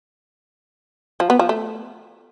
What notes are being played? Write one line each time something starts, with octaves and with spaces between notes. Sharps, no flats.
F3
B3
F3
A3